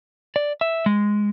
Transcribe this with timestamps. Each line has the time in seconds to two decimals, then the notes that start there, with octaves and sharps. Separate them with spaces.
0.36 D5
0.61 E5
0.86 G#3